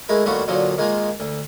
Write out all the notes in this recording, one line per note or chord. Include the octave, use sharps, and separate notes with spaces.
G#3 A3 E4 A#4
D#2 G3 A3 F4 F#4
A#2 D3 F3 F#3
D#3 G#3 A#3 F4
D2